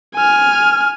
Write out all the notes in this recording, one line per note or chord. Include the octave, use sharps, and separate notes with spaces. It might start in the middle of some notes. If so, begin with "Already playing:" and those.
G#5 F6